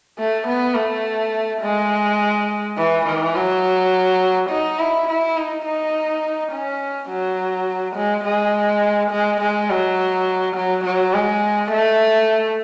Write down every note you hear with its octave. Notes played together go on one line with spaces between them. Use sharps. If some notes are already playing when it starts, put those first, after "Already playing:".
A3
B3
A3
G#3
E3
E3
F#3
D#4
E4
E4
D#4
D#4
C#4
F#3
G#3
G#3
G#3
G#3
F#3
F#3
F#3
G#3
A3